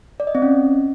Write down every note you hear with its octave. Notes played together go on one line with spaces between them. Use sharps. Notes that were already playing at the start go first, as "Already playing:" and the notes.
D5
D#5
C4
C#4